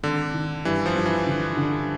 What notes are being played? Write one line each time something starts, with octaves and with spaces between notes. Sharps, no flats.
G#1 D3
D#3
G2 E3
F3
G2
E3
D3
D3